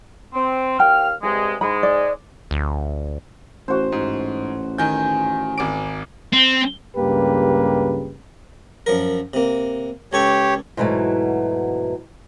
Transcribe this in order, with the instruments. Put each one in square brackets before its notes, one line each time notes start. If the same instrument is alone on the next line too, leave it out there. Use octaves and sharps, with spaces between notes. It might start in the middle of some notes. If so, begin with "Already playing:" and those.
[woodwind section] C4
[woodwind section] D#2 F5 F6 [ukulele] G5
[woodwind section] G2 C3 G#3 [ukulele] G#4
[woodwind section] G#2 G#3 [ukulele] B5
[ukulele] D5
[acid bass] D2
[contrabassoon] A1 [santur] F#4 C5
[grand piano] G#2
[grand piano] D#3 G6 [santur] G#5
[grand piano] G#1 D6 D7
[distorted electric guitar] C4
[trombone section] C#2 G2 C#3 A#3 G4 B4
[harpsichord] F#2 F3 A#4
C3 A#3
[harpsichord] C#2 A4 C#6 [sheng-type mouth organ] G4 C#5
[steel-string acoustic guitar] G#2 B2 E3 F#3 A3